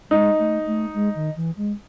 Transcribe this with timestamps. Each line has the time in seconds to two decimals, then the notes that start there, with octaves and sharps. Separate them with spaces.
0.10 G#3 D#4
0.39 A3
0.66 A3
0.94 G#3
1.15 D#3
1.36 E3
1.57 G#3